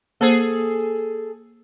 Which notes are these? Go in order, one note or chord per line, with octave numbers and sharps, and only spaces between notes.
A#3 G#4 A4 C5